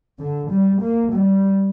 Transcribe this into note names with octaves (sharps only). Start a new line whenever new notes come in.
D3
G3
A#3
G3